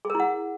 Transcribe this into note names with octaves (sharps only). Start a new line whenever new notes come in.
G#4
A#4
E4
F#5